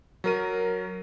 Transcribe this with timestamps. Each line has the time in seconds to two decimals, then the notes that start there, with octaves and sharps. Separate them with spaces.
0.24 F#3 A#4 D#7